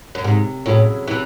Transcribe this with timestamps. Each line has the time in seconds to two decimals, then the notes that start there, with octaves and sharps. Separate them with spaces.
0.15 F#2
0.24 G#2 C3
0.66 A2 F#3 C#4 E4 G#4
1.08 C3 E3